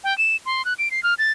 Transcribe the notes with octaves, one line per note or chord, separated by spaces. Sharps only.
G5
E7
C6
F#6
D7
C7
F6
A6